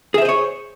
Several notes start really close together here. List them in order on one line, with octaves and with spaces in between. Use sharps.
G#4 E5 C5 D#5 C#5